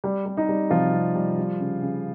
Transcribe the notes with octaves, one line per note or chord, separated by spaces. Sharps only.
G3
G3
D#4
G3
C3 F3 F4
G3
G3
G3
C#3
C#3